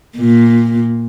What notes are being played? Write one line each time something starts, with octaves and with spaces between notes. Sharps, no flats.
A#2